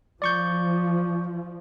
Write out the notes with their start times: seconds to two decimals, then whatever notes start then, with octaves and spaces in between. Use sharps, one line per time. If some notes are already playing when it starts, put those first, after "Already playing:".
0.22 F3 D5 C#6 G6